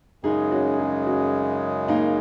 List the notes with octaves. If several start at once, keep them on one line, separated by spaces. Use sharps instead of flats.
F#2 C#3 G#3 D#4 G#4
C#4 F#4
D#4 G#4
C#4 F#4
A#3 D#4